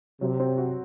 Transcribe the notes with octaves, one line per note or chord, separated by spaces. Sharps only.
C3 F#3
C4
F#4